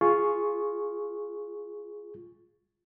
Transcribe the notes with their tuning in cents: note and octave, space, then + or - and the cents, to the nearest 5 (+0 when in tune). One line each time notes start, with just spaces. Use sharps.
F4 +0 G#4 +0 C#6 +0